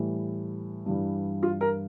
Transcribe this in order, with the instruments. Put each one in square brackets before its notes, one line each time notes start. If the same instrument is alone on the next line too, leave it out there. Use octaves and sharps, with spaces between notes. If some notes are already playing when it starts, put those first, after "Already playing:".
Already playing: [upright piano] A2 E3 G3
G2 E3 G3
F4
A#4